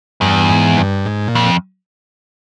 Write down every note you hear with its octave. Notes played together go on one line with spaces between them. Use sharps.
E2 G2
G#2
G2
G#2
A#2
F2